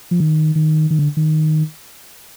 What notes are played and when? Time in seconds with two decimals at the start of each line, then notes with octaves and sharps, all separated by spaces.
0.11 F3
0.20 D#3
0.55 D#3
0.91 D#3
0.99 D3
1.17 D#3